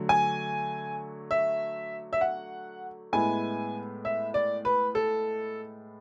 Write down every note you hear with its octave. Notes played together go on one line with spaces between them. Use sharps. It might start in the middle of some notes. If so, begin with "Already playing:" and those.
Already playing: D3 F#3 A3
G#5
E5
E5
F#5
A2 G#3 B3 E4 G#5
E5
D5
B4
A4